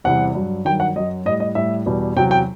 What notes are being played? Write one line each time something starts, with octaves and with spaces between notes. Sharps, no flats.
E2 C3 E3 G3 F#5
G2 F#3
G2 D#3 F#3 G5
F#5
F#2 F#3 D#5
A2 G3 D#5
D#5
A2 G3 E5
E2 B2 G3
E2 C3 F#3 G5
G5